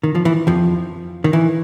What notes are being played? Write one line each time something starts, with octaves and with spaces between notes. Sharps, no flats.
D#3
F3
E3
F2 F3
D#3
E3